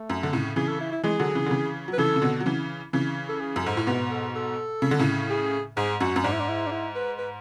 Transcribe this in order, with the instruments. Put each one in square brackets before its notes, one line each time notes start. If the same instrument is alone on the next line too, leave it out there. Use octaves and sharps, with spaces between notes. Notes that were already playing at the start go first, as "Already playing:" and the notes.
Already playing: [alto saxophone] A3
[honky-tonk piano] F#2
D3
A2 C#3
[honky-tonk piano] C#3 E3 [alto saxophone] G#4
[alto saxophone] A4
E4
E4
[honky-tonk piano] E3 G#3 [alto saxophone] G#4
[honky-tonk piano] D3 F#3
C#3 E3
D3
C#3 E3
F#3
[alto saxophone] B4
[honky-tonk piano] C#3 E3 [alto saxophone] A4
[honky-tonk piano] C#3
B2 D3
F#3
C#3 E3
C#3 E3
[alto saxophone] A4
G#4
[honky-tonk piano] F#2
[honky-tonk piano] G#2 [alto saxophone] A4
[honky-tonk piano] A2
[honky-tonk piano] G#2 B2 [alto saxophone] B4
[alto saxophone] A4
A4
[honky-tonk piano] C#3
D3
A2 C#3
[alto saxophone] G#4
[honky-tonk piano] G#2 [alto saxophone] G#4
[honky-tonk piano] F#2 [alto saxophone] F#4
[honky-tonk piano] F#2
[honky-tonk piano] G#2 [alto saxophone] D4
[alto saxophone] E4
D4
E4
D4
E4
B4
B4